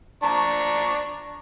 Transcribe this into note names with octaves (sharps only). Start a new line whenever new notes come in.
D4 A#5 C#6